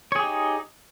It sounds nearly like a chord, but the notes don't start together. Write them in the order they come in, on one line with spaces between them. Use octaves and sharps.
C#5 G#4 G4 D#4